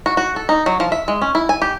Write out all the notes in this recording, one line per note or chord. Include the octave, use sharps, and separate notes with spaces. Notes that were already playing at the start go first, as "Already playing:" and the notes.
F#4
F#4
A4
D#4
F#3
F3
E5
G#3
C#4
E4
G#5
G4